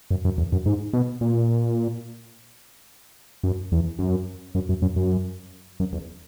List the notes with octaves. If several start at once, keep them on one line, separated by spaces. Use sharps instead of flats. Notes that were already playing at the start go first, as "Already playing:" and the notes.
F#2
F#2
E2
F#2
G#2
B2
A#2
F#2
E2
F#2
F#2
F#2
F#2
F#2
F#2
E2